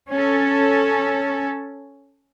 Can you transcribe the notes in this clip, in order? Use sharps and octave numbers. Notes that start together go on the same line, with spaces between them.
C#4 A4